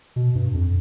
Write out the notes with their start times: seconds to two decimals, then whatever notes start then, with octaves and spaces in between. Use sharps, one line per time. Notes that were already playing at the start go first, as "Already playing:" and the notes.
0.16 B2
0.35 G2
0.54 F2